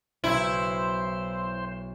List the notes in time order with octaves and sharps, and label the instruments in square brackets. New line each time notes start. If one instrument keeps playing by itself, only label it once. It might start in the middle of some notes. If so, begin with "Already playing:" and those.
[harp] B1 [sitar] E4 [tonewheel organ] C5